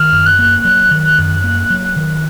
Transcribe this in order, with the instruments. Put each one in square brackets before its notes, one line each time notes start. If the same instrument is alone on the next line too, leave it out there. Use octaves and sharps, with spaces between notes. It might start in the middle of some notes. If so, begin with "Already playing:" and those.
Already playing: [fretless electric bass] D#3 [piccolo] F6
[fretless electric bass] F#2
[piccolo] F#6
[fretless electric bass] A#3
F#3
D#3
F#2
A#3
F#3
D#3